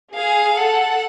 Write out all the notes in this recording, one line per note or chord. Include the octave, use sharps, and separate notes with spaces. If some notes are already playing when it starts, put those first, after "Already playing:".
G#4 F5
A4 F#5